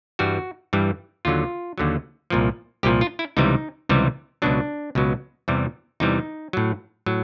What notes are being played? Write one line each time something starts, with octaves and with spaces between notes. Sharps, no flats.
G2 E3 G3 F#4
G2 E3 G3
D#2 D3 F#3 F4
D#2 D3 F#3
C2 A#2 F3
C2 A#2 F3 G4
F4
E4
C#2 C3 E3 G3 D#4
C#2 C3 E3 G3
C#2 B2 F#3 D4
C#2 B2 F#3
E2 C3 E3 G3
E2 C3 E3 G3 D#4
A2 F#3
A2 F#3